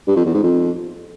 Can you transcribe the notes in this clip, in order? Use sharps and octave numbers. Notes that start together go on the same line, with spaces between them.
G2
F2
E2
G#2
F2